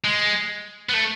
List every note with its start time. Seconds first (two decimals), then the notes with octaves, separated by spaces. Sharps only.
0.04 G#3
0.89 B3
0.94 A3